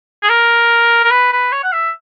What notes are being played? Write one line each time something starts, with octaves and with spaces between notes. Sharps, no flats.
G#4
A#4
A#4
B4
B4
C#5
F#5
E5